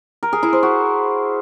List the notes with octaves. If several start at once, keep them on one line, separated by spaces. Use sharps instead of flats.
A#4
G#4
E4
C5
F#4